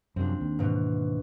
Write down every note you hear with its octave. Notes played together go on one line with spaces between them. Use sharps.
F#2 C3 F3 C4 D4
D#2
G#2 B2 E3